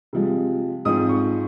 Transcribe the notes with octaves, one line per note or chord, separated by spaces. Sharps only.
C3 F3 G#3
G#2 F3 C4 D#6
C#6